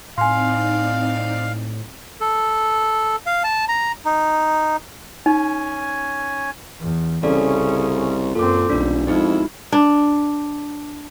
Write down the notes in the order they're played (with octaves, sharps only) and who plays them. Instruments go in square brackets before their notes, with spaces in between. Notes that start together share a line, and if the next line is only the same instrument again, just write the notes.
[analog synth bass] A2 [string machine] C4 D#4 D5 [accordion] F5 [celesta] G#5 C6
[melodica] A4
F5
A5
A#5
D#4
[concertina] C#4 G#5 [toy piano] D#4
[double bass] E2
[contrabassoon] C2 [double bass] C#3 C#4 [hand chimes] A4 D5
[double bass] F#2 C4 [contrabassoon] A#2 [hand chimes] A4 D6
[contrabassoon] D#1 [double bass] B1 [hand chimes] D4 F4 D5
[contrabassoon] F2 [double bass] G#3 E4 [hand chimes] B3 D#4 F#4
[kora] D4